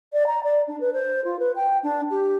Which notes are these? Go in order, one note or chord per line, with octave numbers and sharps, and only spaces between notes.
D5
A#5
D5
D4
B4
C5
F4
B4
G5
D4
G4